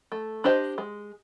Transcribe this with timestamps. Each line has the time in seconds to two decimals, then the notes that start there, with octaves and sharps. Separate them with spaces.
0.12 A3
0.44 D4 G4 C5 D#5
0.78 G#3